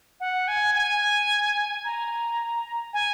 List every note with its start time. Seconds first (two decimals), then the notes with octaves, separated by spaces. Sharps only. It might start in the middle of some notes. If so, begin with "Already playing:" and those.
0.20 F#5
0.48 G#5
0.75 G#5
1.84 A#5
2.94 G#5